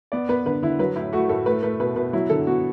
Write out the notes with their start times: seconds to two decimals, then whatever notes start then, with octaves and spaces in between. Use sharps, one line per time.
0.12 B3 D5
0.29 B3 B4
0.45 D3 B4
0.62 D3 E4
0.79 F#3 B4
0.96 A2 E4
1.13 A3 F#4
1.29 A2 A4
1.46 A3 B4
1.63 A3 B4
1.80 B2 B4
1.96 B2 B4
2.13 F#3 E4
2.30 D3 A4
2.47 B3 F#4